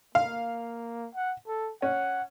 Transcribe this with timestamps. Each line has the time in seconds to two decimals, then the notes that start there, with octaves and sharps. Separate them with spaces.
0.15 A#3 F5
1.15 F#5
1.48 A4
1.82 C#4 F#5